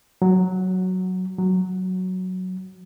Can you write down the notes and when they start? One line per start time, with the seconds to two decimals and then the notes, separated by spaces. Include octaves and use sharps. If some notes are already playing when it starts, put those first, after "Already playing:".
0.22 F#3
1.38 F#3